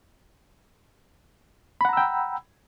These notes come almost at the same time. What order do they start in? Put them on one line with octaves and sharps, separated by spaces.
B5 F#5 A#5 E6 G5